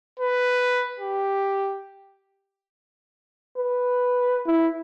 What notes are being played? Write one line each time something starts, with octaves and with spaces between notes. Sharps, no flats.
B4
G4
B4
E4